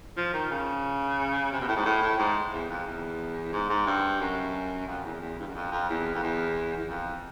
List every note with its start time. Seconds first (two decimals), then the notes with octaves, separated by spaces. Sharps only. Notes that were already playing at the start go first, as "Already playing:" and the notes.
0.17 F3
0.34 D#3
0.51 C#3
1.52 C3
1.61 B2
1.68 A2
1.76 G#2
1.85 A2
2.02 A2
2.18 G#2
2.53 E2
2.69 F2
2.87 E2
3.53 G#2
3.70 G#2
3.87 G2
4.21 F#2
4.88 F2
5.05 E2
5.21 E2
5.40 G2
5.47 F#2
5.55 F2
5.72 F2
5.89 E2
6.15 F2
6.23 E2
6.78 E2
6.89 F2